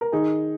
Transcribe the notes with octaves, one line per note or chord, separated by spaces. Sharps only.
A#4
D#3 D#4 G#4